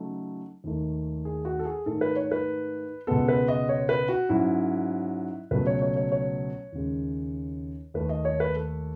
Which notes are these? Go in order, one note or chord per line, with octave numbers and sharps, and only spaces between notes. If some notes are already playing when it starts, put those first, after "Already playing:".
Already playing: C#3 F#3 A3 D#4
D#2 D#3 A3 D#4
G#4
F#4
A4
G#4
G#2 D#3 A3 D#4 A4
B4
C#5
B4
C#2 B2 G#3 B3 A4
B4
D#5
C#5
B4
F#4
G#2 F#3 C#4 E4
C#2 B2 F#3 A3 B4
C#5
C#5
C#5
C#5
D#2 C#3 G#3
D#2 D#3 A3 B4
D#5
C#5
B4
A4